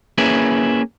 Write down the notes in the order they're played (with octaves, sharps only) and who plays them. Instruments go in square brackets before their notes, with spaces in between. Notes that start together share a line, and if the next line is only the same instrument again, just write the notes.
[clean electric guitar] A#3 C#4 E4 G#4 B4